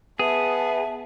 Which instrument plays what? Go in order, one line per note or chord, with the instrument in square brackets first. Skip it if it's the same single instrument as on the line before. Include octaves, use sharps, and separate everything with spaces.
[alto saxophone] B3 [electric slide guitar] G#4 [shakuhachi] E5 [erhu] A5